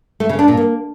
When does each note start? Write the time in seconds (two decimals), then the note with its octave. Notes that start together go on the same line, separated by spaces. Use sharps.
0.20 A3
0.29 C#3
0.39 D4
0.48 A#2
0.57 A#3